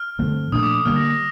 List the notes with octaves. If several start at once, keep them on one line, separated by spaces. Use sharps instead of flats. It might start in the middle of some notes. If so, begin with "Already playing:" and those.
Already playing: F6
G2 D3 A3 C4
A#2 F3 A3 D4 D#6
D6
D#6
D3 G3 A#3 F6
A#6
A#6